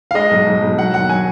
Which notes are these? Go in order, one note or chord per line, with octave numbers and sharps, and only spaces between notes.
F5
G#3 D#5
B1
B1
B1
F#3 F#5
D#2 F#5
F#3 G#5